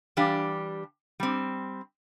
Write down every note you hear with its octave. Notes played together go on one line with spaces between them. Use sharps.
E3 G3 D4 G4 F5
G3 C4